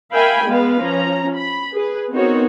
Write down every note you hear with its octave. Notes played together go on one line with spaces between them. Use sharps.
A#4 E5 F5 G5 G#5 B5
G#3 B3 B4 F5
F3 C#4 A#5
B5
G#4 B4
B3 C4 D#4 F#4 A#4 C#5